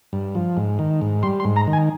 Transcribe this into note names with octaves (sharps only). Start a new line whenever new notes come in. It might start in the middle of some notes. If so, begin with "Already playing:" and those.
G2
F3
G#2
D#3
G#2
G3 C6
C6
G#2
A#5
D#3
G#5